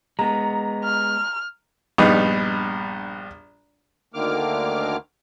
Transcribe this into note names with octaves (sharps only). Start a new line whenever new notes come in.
G#3 B3 A#5
F6
A#1 G2 B3 D#4
D2 D3 D#3 A#3 D6 F6